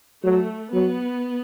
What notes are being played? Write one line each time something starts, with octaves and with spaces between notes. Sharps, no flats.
F#3 A3
F#3 B3